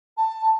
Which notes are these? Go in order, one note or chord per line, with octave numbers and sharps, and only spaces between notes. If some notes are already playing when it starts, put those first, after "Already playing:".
A5